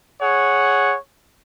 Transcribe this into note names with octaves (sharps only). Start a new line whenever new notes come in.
G#4 C#5 F#5